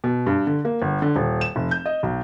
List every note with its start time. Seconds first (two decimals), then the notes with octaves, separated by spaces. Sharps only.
0.04 B2
0.26 G2
0.47 D3
0.65 A#3
0.82 G1
1.02 D3
1.16 D#1
1.41 E7
1.56 F1
1.71 G6
1.86 D#5
2.03 B1